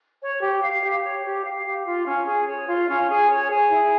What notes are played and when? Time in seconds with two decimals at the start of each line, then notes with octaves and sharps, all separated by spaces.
0.21 C#5
0.41 G4
0.62 F5
0.83 G4
1.03 C#5
1.24 G4
1.44 F5
1.64 G4
1.85 F4
2.05 C#4
2.25 G#4
2.47 C#5
2.67 F4
2.88 C#4
3.08 G#4
3.29 C#5
3.49 G#4
3.69 E4